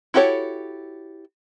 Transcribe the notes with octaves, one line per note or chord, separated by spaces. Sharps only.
E4 F#4 G4 A4 C#5